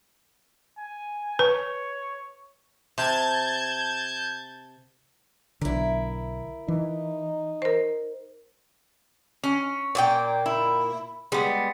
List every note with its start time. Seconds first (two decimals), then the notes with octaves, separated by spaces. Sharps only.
0.78 G#5
1.39 B4 C#5
2.98 C3 A5 G6 G#6
5.61 B1 D3 E4 A#4
6.68 E3 D#4
7.62 A#4 C5
9.44 C#4
9.95 A#2 A#3 G5
10.46 E4
11.32 G3 G#3 B3